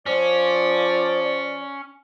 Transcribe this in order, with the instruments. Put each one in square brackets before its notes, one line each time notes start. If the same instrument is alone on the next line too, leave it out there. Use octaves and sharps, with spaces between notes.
[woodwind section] F3 D5 [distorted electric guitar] C#4